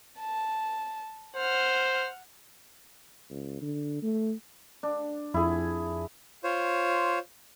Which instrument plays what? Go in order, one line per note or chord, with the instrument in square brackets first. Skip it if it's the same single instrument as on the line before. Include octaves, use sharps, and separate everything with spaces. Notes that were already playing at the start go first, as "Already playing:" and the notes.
[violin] A5
[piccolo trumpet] C5 [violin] F#5 F6
[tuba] C#2
D3
A3
[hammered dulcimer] D4
[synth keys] F2 [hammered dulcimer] E4 G#4
[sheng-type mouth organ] F4 C5 C#5